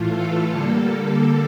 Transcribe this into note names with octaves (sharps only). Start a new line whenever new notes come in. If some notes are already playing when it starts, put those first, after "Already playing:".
Already playing: A2 E3 A3 F4
A4
D3 G3 A#3 A4